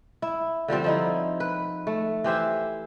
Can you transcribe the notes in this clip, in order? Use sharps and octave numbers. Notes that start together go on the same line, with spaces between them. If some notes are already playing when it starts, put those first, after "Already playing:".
E4
D3 F3 G3 C4
F3 D#4 E4
B4
A3
E3 G4 C5 E5